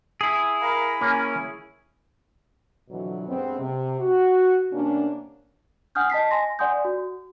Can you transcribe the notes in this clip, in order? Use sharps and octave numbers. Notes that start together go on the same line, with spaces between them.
E4 G#4
A#4 F5 A#5 B5
A#3 C#4
F2 B2 D3 E3 F#3
G2 G#3 B3 C4
C3
F#4
C3 E3 A#3 B3 C#4 D4
F#5 G#5 D#6 F6 G6
D#5 A5 B6 C7
G#5 C6 A#6
D5 F#5 G#5 C6 D#6 G6
F#4